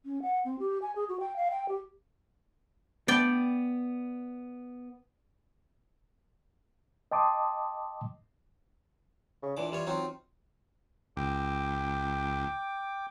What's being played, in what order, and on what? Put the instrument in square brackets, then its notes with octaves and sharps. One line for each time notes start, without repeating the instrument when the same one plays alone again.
[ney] C#4
F#5
C4
G4
G#5
G#4
F#4
G5
F5
G5
G4
[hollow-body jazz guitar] B3 B4 [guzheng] D5 G5
[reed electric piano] D#5 G5 A5 C6 D6 D#6
[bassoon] C#3
[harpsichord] A#2 E3 D6 [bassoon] D4
[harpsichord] E3 F4 C#5 [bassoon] G3
[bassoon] F#3 [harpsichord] C4 D#4 F4
[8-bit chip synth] C#2 [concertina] G5 D6